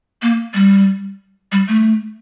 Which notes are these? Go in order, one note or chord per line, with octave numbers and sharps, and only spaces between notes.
A#3
G3
G3
A3